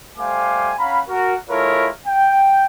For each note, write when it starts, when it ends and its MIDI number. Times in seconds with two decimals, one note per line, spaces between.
0.18 0.73 55
0.18 0.73 57
0.18 0.73 72
0.18 0.73 77
0.18 0.73 80
0.18 0.73 86
0.79 1.00 61
0.79 1.00 77
0.79 1.00 78
0.79 1.00 82
0.79 1.00 83
1.09 1.34 66
1.09 1.34 70
1.49 1.88 56
1.49 1.88 64
1.49 1.88 65
1.49 1.88 69
1.49 1.88 70
1.49 1.88 73
2.07 2.66 79